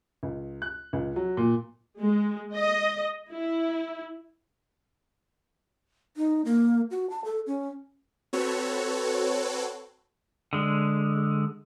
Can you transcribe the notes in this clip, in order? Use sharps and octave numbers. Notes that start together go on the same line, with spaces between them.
C#2
F#6
C#2
F#3
A#2
G#3
D#5
E4
D#4
A#3
F#4
A5
A4
C#4
C4 F#4 A4 B4 C#5
D3 G#3